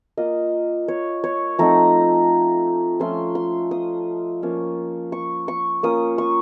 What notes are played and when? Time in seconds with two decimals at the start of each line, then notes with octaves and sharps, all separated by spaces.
0.17 A#3 F4 D#5
0.88 C#5
1.24 C#5
1.59 F3 A3 C4 D#4 A#5
3.00 F3 A3 C#4 F4 C6
3.35 C6
3.71 D#6
4.42 F3 A#3 C#4 F4
5.12 C#6
5.48 C#6
5.83 A#3 C#4 F4 D#6
6.18 C#6